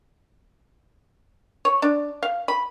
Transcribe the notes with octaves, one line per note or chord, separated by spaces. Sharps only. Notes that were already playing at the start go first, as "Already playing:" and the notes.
C#5
D4
F5
B5